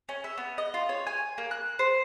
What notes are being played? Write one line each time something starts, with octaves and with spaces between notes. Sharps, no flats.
C#4
E5
B3
D#5
F4
C#5
G#5
A#3
F#6
C5